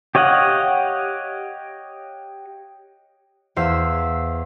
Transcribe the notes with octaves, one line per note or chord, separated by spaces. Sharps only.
G4 C#5 D#5 F5 F#5
E2 C5 F5 E6 B6 C7